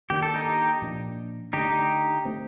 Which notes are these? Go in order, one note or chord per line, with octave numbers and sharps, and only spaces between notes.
D#3 A#3 D4 G4
A4
D#4 G4
A#2 F3 A#3 D4
D3 A3 D4 D#4 G4
D3 A3 C4